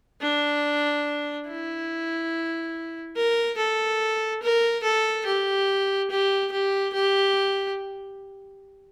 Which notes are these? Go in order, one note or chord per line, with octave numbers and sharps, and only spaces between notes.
D4
E4
A#4
A4
A#4
A4
G4
G4
G4
G4